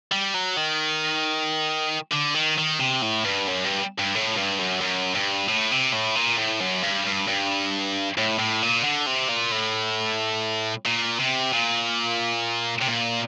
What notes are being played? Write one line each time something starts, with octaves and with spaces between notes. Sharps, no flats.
G3
F#3
D#3
D3
D#3
D#3
C3
A2
G2
F#2
G2
G2
A2
G2
F#2
F#2
G2
A2
C3
A2
A#2
A2
F#2
G2
G2
G2
A2
A2
A#2
D3
C3
A#2
A2
A#2
C3
A#2
C3
A#2